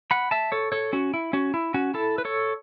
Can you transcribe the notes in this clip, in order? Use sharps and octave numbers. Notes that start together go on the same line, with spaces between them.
F#5 B5
E5 A5
A4 C#5
A4 C#5
C#4 F#4
E4
C#4 F#4
E4
C#4 F#4
E4 A4
B4
A4 C#5